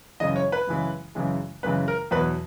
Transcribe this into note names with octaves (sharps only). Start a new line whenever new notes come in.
F#2 C#3 E3 G#3 D#5
C#5
B4
F#2 C#3 E3 G#3
F#2 C#3 E3 G#3
F#2 C#3 E3 G#3 B4
A#4
E2 B2 F#3 B4